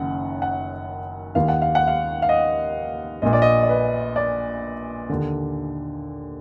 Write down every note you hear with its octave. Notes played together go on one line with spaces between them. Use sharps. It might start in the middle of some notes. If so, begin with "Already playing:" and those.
Already playing: F#1 F#2 D#3 F#5
F#5
D#2 D#3 F5
F#5
F5
F#5
F5
F5
D#5
A#1 A#2 D#5
D5
D#5
D5
B4
D5
D#2 D3